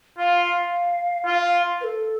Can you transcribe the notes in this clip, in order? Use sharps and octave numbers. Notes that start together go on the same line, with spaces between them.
F4 F5
F4
B4
A4